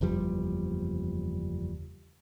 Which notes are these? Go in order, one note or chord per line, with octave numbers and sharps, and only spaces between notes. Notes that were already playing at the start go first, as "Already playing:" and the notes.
F#1 E2 F3 G3